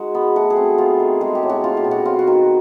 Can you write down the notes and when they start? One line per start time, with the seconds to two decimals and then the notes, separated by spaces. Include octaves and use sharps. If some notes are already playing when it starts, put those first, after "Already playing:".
Already playing: G#3 D#4 F#4
0.15 B3
0.36 A3 F#4
0.50 G#4
0.57 C4
0.78 B3 F4
1.00 D#3
1.21 G#3 F#4
1.35 G4
1.43 A2
1.49 F#4
1.64 C#4 F4
1.77 G4
1.84 B2
1.91 F#4
2.05 C4 F4
2.19 F#4
2.27 D#3